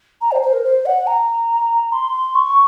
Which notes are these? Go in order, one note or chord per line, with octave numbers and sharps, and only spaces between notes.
A#5
C5
C5
A#4
C5
F#5
A#5
C6
C#6